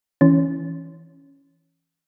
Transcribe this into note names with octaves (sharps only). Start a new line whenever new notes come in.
E3 C#4